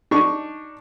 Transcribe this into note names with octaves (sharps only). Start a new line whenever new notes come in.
D4 D#4 C#6